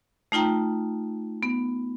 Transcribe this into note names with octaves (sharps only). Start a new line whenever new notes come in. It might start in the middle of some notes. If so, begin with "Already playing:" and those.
A3 D#4 F4 G5 A#5
B3